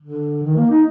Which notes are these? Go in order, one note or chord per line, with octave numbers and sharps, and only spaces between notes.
D3
D#3
A#3
D#4